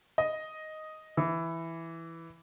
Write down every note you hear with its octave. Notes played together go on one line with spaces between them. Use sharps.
D#5
E3